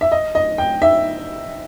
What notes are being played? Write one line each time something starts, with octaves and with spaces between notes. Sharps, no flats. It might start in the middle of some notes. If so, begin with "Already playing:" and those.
E5
D#5
D#5
G5
E5